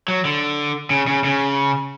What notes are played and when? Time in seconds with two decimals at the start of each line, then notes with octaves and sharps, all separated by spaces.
0.08 F#3
0.25 D3
0.90 C#3
1.07 C#3
1.25 C#3